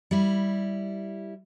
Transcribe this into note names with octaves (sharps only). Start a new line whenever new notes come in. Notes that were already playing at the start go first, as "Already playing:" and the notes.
G3 E4